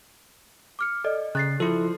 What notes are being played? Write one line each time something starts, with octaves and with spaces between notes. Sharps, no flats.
D6 F6 C#7
A4 D5 D#5
C#3 F#6 A6 C7
F3 E4 A4